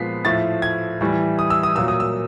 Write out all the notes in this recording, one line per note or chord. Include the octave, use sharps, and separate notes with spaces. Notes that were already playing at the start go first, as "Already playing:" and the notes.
Already playing: A#2 F3 G#3 B3 B6 C7
A2 F3 A3 A6
G#6
A2 E3 G3
D#6
E6
D#6
A#2 F#3 A#3 E6
D#6
E6